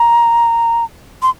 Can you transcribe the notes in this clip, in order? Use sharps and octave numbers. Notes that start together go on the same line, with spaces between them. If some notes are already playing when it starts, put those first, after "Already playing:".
Already playing: A#5
C6